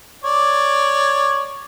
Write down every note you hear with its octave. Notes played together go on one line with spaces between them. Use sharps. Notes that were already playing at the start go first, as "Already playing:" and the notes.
C#5 D5